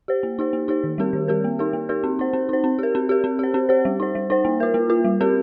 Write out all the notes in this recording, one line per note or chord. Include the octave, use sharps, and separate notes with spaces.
G4 C5
A#3
D#4 G4 C5
A#3
D#4 G4 C5
D#3
G3 C4 G4 A#4
D#3
G3 C4 G4 A#4
A#3
D#4 G4 A#4
A#3
D#4 G4 A#4
C4
D#4 C5
C4
D#4 C5
C4
G4 A#4
C4
G4 A#4
C4
G4 C5
C4
G4 C5
G3
D#4 C5
G3
D#4 C5
A#3
F4 A#4
A#3
F4 A#4
G3
C4 G4 A#4